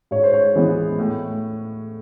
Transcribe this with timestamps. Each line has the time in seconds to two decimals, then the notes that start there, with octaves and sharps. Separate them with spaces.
0.11 G#2 C#5
0.23 C5
0.34 C#5
0.56 E3 G#3 B3
0.98 A2